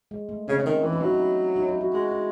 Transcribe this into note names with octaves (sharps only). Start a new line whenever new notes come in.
G#3
A3
C#3 C4
C#3
D#3 C#4
E3 D#4
E4
F#3 D#4
E4
D#4
D#4
E4
F#4
G#3 F#4
E4